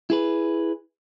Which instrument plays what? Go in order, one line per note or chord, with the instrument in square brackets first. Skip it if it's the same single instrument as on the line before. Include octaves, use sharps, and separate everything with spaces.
[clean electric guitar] E4 G#4 B4